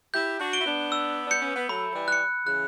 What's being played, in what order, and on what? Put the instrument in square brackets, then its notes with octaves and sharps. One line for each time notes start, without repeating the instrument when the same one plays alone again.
[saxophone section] E4 G4 [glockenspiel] G6
[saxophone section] D4 F#4
[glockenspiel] D7 G7
[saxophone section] E4
B3 D4
[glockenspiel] E6
[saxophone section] D4 [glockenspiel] G6 C#7
[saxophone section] C#4
B3
[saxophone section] F#3 A3 [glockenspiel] B5
[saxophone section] F#3
E3 G3
[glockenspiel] F#6 C#7
[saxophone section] C#3 E3 [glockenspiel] F#6